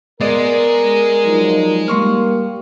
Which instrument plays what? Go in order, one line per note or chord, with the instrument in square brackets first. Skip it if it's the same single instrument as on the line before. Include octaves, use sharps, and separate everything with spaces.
[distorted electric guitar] G#3 [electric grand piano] B3 D5 D#5 [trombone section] A#4
[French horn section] F3 F#3 D#4
[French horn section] G3 A#3 [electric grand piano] C6 C#6 F6